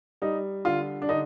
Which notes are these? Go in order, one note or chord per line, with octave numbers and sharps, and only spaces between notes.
G3 D#4
D3 F4
D4
D3 D#4